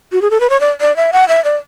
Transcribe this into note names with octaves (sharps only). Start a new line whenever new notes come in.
F#4
G#4
A4
B4
C#5
D5
D5
E5
F#5
E5
D5